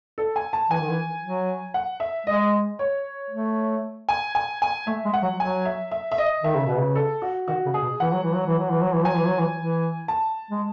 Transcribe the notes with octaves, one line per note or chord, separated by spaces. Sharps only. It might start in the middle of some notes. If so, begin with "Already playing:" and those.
A4
G#5
A5
E3 G#5
D#3
E3
F#3
F#5
E5
G#3 D#5
C#5
A3
G#5
G#5
G#5
A3 E5
G#3
F#5
F#3
F#3 G#5
E5
E5
E5
D#5
D#3 E5
C#3
B2 B4
C#3
A4
F#4
D#3 F#4
C#3
G#4
B2
E3 F#5
F#3
E3
F#3
E3
F#3
E3
F#3
E3
F#3 G#5
E3
F#3
E3
E3
A5
G#3